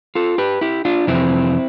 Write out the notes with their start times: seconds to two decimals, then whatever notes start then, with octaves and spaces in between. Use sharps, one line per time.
0.15 F4 A4
0.38 G4 B4
0.61 E4 G4
0.85 D4 F4
1.07 F2 C3 E3 C4 E4